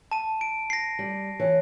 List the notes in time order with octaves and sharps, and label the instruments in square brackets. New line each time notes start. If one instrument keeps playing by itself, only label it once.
[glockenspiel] A5 D#7
D7
A#6 C7
[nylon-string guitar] G3
E3 C#5